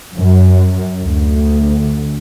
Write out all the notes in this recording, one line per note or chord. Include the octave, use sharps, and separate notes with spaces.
F#2
D2